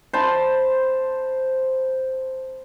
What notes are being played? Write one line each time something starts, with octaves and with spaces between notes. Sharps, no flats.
C5 A5 B5 C6